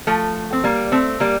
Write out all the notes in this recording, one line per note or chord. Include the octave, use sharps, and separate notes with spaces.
F3 A3
C4
G3 A#3
A3 C4
G3 A#3